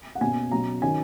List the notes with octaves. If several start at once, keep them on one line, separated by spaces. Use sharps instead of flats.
F#5
B2 A#3 C#4 G#5
B2 F#3 C#4 A#5
D#3 F#3 C#4 G#5